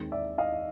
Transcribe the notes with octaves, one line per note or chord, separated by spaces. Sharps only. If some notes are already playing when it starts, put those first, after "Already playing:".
Already playing: D#2 D#3 G#3 C4
D5 E5
D#5 F5